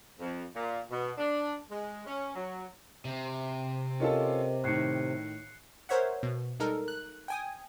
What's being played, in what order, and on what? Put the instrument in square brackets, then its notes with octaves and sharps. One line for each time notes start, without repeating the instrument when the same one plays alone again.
[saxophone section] F2
A#2
B2
D4
G#3
C#4
F#3
[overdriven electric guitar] C3
[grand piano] C#4 F4 A4 [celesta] G4 A#4 D#5
[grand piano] A2 D#3 [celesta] F#6 C7 C#7
[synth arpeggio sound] A#4 C5 C#5 E5 F#5
B2
G3 G#3 D#4 A4 A#4
F#6
G5 G#5 D#6